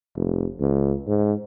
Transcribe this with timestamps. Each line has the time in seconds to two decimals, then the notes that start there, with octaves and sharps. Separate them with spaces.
0.16 F1
0.60 C#2
1.07 G#2